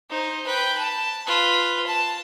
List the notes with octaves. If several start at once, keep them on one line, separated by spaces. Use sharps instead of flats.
D#4 C5
B4 G5
A5
F4 B4
A5